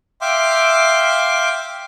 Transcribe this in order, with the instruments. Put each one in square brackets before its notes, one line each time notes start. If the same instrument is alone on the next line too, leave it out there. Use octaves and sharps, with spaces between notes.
[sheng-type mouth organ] E5 F5 G5 C6 D6